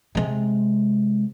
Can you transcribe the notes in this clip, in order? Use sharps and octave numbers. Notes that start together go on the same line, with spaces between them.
C3 G#3